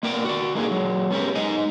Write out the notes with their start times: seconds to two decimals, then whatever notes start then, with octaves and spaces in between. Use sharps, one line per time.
0.03 A#3 B3 A#4 D5 G5
0.25 F#4 D5
0.55 G#3 A#3 D#4 G#4
0.71 F#3 G#3
1.11 B3 C#4 G4 A#4
1.35 G#3 D#4 D#5